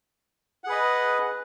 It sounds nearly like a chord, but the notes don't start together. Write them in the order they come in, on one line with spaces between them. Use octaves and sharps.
F#5 G#4 B4 D#5